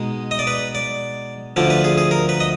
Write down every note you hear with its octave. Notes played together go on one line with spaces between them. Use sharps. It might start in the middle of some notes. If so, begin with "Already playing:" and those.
Already playing: B2 G#3 D#4
D#5
D5
B4
D5
D2 D3 F3 D5
B4
G#4
G#4
A#4
B4
D#5